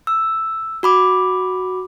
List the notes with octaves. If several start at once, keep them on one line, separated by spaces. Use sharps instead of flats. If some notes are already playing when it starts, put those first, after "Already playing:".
E6
F#4 B5 D6